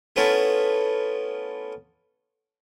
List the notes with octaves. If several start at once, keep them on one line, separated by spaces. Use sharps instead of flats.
A3 B3 C#4 E4 F4 A4